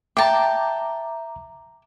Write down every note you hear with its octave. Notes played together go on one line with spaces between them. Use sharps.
E5 G5 A5 A#5 D6